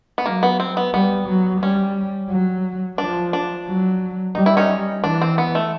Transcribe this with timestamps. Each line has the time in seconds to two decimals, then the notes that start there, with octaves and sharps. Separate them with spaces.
0.18 B3
0.25 F#3 A#3
0.43 B3
0.60 C4
0.77 B3
0.94 G3 B3
1.28 F#3
1.62 G3 C#4
2.30 F#3
2.98 F3 D4
3.33 D4
3.67 F#3
4.35 G3 D#4
4.46 E4
4.57 C#4 D#4
5.04 E3 D4
5.22 C4
5.38 B3
5.55 A3